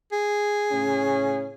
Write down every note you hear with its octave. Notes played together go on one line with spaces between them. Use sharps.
G#4
A2 C#3 C#4